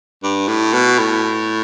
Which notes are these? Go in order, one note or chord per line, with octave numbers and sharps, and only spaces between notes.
G2
A2
B2
A2